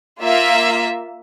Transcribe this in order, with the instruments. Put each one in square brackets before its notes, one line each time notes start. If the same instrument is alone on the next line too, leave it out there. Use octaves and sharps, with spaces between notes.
[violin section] A#3 F4 E5